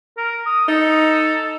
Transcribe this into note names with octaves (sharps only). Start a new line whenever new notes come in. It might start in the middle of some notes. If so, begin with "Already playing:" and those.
A#4
D#6
D#4 A4